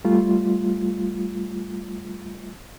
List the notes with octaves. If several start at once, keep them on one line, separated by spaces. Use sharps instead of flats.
G3 A3 F4